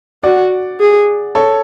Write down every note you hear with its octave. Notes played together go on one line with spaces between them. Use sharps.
F#4 D5 F#5
G#4
A4 C#5